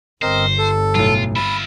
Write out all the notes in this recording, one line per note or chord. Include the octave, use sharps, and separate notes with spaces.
G1 C4 A#4 C5 D#5
A4
B1 A2 F4
F4 E5 B5